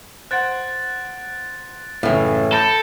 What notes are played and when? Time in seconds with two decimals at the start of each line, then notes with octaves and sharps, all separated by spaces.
0.31 C5 F#5 F#6 A6 D7
2.03 F#1 A2 C#3 E3
2.52 A4 B5 G6 A#6 D7